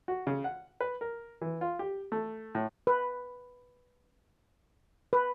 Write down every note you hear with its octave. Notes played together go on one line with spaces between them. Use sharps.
F#4
C#3
F#5
B4
A#4
E3
F4
G4
A3
A2
B4
B4